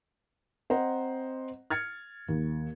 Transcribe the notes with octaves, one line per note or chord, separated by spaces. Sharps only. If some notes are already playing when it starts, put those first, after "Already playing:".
C4 C5 D#5 F#5 A#5
F6 G#6 A6 C#7
D#2